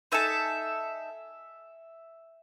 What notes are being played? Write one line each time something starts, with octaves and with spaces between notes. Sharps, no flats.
D#4 A4 E5 G#5